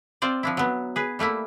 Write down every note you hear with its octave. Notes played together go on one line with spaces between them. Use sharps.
C4 F4 C5 D5
F3 D4 E4
F#3 B3
G#4 B4
G3 A3 A#3 E4